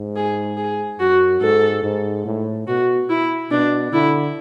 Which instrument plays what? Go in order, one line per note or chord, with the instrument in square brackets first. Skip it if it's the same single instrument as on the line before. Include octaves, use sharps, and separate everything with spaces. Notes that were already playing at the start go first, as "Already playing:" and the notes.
Already playing: [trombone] G#2
[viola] G#4
G#4
[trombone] F#2 [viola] F#4
[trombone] G#2 [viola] A4
[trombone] G#2
A2
[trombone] B2 [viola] F#4
[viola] E4
[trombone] B2 [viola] D4
[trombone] D3 [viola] E4